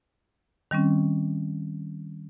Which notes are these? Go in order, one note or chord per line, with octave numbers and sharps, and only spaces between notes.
D#3 G3 C4 C#4